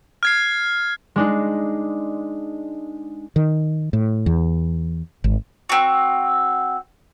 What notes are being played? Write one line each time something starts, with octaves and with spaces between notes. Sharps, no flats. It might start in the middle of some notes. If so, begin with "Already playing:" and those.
F6 G#6 C7
G#3 D4 D#4
D#3
A2
E2
G#1
C4 F#4